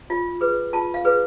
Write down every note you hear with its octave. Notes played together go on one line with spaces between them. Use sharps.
F4
G#4 B4
F4 A5
F5
G#4 B4